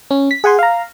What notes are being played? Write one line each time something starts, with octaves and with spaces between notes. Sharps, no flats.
C#4
B6
G#4 F#5 G#5 C6
F5 A#5